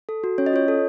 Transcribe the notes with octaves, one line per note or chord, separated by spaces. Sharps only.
A4
F#4
C#4 C#5
D#5
F4 C#5
A4